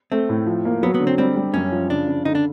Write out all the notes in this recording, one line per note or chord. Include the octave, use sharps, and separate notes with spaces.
A3 C4
A2
F3
A#3
F#3 B3
B3
D3
C4
G3 C4
G3
F#2 C#4
F3
C#3 D4
C#3
D3 D#4
D4